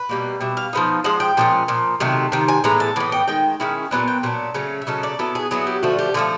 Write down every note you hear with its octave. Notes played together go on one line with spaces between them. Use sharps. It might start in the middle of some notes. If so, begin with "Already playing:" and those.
Already playing: B4
B2 G3 A#3
B2 G3 E5
F5
F3 G#3 B3 D#4
F3 G#3 F#5
G5
A#2 F3 G#3 C#4
A#2 F3
C3 D#3 F#3 A3
C3 D#3
G#5
A2 E3 G#3 B3 A#5
A5
A2 E3 B3
G5
D#3 G#3 G5
D#3 G#3 C#4 E4
A#2 F#3 B3 D4 G#5
G5
A#2 F#3 B3 D4
C#3 F#3 A3 C#4
E5
C#3 F#3 A3 C#4 D#5
D5
F#3 B3 E4 A4
G#4
F#3 B3 E4 G#4
G4
D3 F3 A3 F#4
G4
D3 F3 A3 G#4